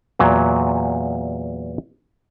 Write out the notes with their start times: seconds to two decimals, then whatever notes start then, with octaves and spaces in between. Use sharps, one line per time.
0.19 E2 A#2 F#3